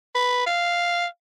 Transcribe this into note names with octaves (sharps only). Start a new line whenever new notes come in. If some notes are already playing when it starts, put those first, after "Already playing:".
B4
F5